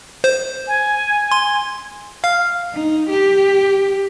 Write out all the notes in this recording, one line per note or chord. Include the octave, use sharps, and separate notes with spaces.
C5
G#5
C6
F5 F6
D#4
G4